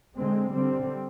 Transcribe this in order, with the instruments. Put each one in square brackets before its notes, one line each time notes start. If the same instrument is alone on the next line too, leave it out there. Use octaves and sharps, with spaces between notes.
[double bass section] D3 G#3 C4
D3 G3 C4